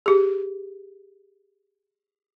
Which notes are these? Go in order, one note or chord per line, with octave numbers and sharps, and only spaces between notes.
G4 G#4